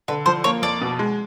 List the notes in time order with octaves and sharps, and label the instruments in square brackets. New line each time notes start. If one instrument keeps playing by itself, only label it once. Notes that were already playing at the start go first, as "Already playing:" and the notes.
[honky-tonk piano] D3 [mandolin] B4
[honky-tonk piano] F3 [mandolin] C5
[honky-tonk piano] A#3 [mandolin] C#5
[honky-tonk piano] F2 [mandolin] D5
[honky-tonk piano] B2
G#3